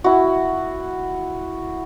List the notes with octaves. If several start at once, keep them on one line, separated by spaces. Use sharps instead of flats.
E4 F#4